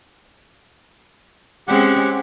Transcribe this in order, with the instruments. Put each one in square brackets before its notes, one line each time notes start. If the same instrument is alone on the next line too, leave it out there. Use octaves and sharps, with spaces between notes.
[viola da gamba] G#3 C4 C#4 [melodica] G4 F#5